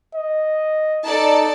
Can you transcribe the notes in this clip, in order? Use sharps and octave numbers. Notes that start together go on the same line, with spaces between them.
D#5
D#4 A4 D5 A5